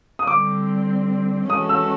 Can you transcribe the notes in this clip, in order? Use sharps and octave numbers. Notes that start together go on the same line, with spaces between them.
D#6
D3 G3 C4 D6
E3 G#3 C#4 F#4 A4 D#6
E6